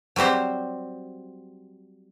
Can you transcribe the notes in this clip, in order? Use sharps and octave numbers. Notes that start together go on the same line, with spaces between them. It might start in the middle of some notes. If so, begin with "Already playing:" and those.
F#3 G3 C4 G4 C5